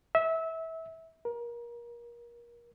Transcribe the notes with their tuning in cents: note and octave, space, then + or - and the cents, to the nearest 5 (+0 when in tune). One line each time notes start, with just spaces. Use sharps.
E5 -25
A#4 +30